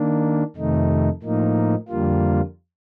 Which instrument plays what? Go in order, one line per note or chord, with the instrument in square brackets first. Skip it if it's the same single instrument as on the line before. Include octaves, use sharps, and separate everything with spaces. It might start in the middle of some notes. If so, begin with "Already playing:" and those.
Already playing: [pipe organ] D#3 A#3 D4
F2 C3 D#3 A3 D#4
A2 F3 A#3 D#4
F2 D3 G3 A#3 F4